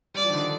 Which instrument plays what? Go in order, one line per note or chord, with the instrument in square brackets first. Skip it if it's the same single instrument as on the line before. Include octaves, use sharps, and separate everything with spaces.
[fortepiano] G3 [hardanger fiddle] D5
[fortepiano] F3
D#3
D3